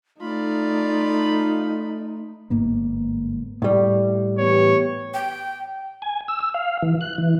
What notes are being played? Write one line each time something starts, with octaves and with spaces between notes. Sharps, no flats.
A3 D#4 F4 D5 B5
G1 G#2 A#3 B3
A2 G3
E3 B3 G4 C#5
G5
G#5
E6
E6
F5
E3
F#6
E3